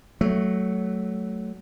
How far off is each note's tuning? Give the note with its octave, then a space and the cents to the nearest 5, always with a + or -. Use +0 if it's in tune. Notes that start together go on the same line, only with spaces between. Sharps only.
F#3 +10 A3 -5